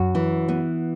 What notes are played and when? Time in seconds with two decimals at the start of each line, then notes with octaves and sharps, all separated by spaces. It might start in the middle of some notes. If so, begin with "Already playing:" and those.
Already playing: F#2 F#4
0.15 E3
0.48 B3